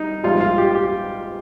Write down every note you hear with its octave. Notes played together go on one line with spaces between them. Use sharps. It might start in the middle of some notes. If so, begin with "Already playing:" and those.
Already playing: G3 D#4
A#1 G#2 G3 F4
F4
G4
G4